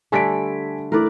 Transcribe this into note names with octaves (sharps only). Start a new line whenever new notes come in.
D3 G3 A3 G#5 B6 D7
A3 E4 A#4 B4 D5